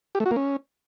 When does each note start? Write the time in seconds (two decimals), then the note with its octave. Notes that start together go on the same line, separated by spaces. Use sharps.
0.15 G4
0.20 A3
0.26 F#4
0.31 A#3
0.36 C#4